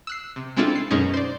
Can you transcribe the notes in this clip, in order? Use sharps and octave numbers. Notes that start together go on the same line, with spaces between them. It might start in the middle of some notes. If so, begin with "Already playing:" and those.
E6 F#6 C7
C3
G#3 C4 D4 E4 F4 A4
C7
F#2 B2 G#3 C#4 D#4
C5 D5